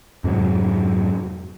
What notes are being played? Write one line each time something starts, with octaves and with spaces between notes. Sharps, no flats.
F2 G#2 C3 F#3